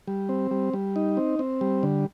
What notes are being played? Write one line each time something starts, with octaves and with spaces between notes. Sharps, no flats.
G3
C4
G3
G3
D#4
C4
C4
G3
D3